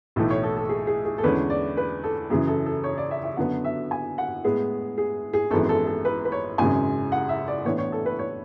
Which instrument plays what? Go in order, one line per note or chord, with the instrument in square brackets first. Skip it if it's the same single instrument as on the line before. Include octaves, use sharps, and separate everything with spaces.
[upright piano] B1 A2 E3 A3 E4 A4
C#5
A4
A4
G#4
G#4
G#4
A4
E2 D3 G#3 C#4 B4
D5
B4
A4
F#2 C#3 E3 G#4
A4
A4
C#5
D5
E5
E5
F#2 D3 F#3 B3 F#5
E5
G#5
F#5
A2 G#3 B3 E4 G#4
G#4
G#4
G#1 F#2 E3 G#3 B3 A4
A4
A4
B4
B4
C#5
G#1 F#2 C#3 G#3 G#5
F#5
E5
D5
A2 E3 B3 D4 C#5
C#5
A4
B4
C#5